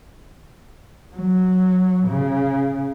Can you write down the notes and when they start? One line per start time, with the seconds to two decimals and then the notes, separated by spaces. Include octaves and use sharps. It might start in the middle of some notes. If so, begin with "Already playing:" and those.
1.16 F#3
2.08 C#3